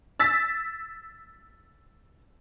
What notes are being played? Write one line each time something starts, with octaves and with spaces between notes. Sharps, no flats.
E6 A6 B6